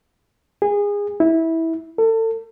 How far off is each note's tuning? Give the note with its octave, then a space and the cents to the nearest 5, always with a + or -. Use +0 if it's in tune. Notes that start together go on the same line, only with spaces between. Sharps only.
G#4 -25
E4 -15
A4 +30